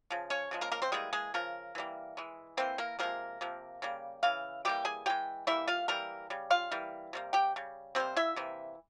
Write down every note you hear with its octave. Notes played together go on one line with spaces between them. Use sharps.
C#3 F3
C#4 C#5
C#3 F3 G#3
A#3 A#4
A#3 A#4
C4 C5
E3 G3 G#3 A#3 G#4
G#3 G#4
C#3 F3 A#4
E3 G3 A#3
E3 G#3
E3 A#3 C4 C5
A#3 A#4
C3 F3 G#3 A#3 A#4
C3 F3 A#3
C#3 G3 A#3
C#3 E3 F5
E3 G3 A#3 G4 G5
G#4 G#5
E3 G#3 G4 G5
E3 G3 A#3 E4 E5
F4 F5
E3 G3 A#3 A#4 A#5
C#3 G3
F4 F5
E3 G3 A#3
C3 G3 A#3
G4 G5
C#3 G3
C3 G3 A#3 C4 C5
E4 E5
C3 E3 A#3